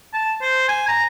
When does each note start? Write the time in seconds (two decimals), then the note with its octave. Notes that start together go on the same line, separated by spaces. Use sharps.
0.14 A5
0.42 C5
0.69 G#5
0.88 A#5